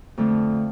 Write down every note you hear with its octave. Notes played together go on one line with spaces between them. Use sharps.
F2 D3 A3